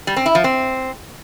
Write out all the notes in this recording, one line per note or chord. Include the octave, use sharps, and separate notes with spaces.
G3
C4
E4
F3
C4